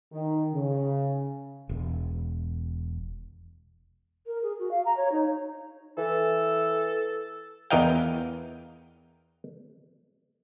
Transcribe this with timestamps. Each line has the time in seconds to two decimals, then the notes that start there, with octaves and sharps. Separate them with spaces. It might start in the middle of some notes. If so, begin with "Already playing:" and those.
0.13 D#3
0.53 C#3
1.69 E1
4.27 A#4
4.43 G#4
4.59 F#4
4.71 F5
4.85 A#5
4.97 C#5
5.12 D#4
5.98 E3 A4
7.70 E2 E3 A#4 D#5 F5 G5